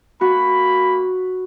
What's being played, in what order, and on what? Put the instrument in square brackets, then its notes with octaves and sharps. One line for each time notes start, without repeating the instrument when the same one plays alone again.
[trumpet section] A#3 B5 [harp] F#4